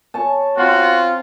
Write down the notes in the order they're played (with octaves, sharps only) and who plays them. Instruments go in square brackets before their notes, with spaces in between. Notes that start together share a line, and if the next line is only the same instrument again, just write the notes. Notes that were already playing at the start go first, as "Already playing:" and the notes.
[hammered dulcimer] C#5 A5
[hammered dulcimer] C4 [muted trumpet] F4 [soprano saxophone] F#4